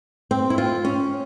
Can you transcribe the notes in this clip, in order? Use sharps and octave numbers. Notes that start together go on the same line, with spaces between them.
C4
E4
F4
C#4